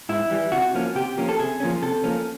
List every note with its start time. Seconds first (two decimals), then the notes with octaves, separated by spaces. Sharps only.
0.09 G#2 E4
0.30 E3 G3
0.52 C3 F#4
0.74 F3 A#3 C#4
0.95 C3 G4
1.18 F3 A#3 C#4
1.29 A4
1.39 C3 G#4
1.60 F3 A#3 C#4
1.82 C3 A4
2.04 F3 A#3 C#4